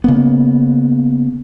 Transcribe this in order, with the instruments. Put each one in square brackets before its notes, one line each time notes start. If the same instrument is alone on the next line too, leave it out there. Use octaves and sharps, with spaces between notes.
[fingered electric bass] C#3 A#3 B3